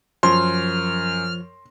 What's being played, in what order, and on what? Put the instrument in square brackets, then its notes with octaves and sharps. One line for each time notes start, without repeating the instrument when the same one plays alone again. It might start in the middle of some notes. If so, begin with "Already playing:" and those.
[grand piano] F#2 [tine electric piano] F3 [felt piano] C6 [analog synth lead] F6